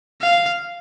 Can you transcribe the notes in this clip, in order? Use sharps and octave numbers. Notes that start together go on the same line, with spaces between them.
F5